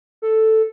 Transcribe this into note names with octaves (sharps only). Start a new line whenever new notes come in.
A4